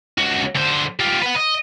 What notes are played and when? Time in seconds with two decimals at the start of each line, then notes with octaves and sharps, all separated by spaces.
0.18 C#2 F#4
0.56 D3 C5
1.00 F4 G4
1.22 B4 F#5
1.37 D#5